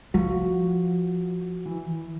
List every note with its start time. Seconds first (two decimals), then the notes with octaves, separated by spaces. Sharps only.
0.14 F3 F#4
1.66 E3